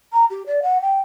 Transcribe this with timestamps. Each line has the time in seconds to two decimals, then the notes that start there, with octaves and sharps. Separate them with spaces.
0.13 A#5
0.30 G4
0.47 D5
0.63 F#5
0.82 G5